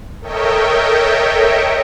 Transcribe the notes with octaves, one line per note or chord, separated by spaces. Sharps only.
A4 A#4 C#5 D#5 E5 G5